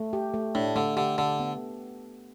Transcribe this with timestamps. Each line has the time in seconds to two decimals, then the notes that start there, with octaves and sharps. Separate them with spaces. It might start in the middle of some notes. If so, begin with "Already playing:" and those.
Already playing: A3
0.13 G4
0.34 A3
0.55 A2 D4
0.76 D3 A3
0.96 D3 G4
1.18 D3 A4
1.40 B3